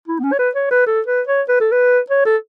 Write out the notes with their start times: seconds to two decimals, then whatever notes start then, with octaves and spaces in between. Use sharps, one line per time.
0.08 E4
0.19 B3
0.23 C#4
0.32 C#5
0.39 B4
0.55 C#5
0.71 B4
0.86 A4
1.07 B4
1.27 C#5
1.49 B4
1.60 A4
1.72 B4
2.10 C#5
2.25 A4